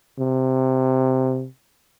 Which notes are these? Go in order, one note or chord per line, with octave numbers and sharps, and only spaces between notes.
C3